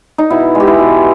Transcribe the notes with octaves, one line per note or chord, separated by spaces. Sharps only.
D#4
B2 E4
G#3
G4
E4
B2